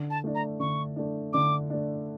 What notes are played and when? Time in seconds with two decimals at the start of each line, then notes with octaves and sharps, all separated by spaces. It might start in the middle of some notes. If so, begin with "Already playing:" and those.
Already playing: D3
0.10 A5
0.24 A3 D4
0.35 A#5
0.60 D3 C#6
0.96 A3 D4
1.33 D3 D6
1.70 A3 D4